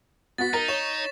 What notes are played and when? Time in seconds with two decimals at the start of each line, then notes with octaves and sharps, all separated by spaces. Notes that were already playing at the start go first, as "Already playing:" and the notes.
0.38 B3 F#4 A6 B6
0.54 D#4 A#4
0.68 C#5 E7